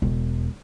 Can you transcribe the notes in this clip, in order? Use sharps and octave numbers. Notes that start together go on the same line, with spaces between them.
E1